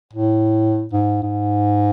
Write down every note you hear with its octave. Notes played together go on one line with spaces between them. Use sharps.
A2
G#2
G#2